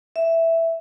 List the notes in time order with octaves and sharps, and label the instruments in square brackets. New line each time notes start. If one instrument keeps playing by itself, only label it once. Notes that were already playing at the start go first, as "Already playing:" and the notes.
[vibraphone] E5